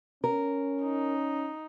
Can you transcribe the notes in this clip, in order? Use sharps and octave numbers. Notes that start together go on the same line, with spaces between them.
C#4 A#4
D#4